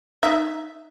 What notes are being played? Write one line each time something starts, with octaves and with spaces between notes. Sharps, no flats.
D#4 E5